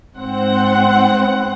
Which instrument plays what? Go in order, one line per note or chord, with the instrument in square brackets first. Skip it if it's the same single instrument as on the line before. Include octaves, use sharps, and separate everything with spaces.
[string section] G#2 C4 F#5